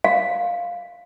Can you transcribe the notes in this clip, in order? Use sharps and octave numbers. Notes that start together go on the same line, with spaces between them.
F5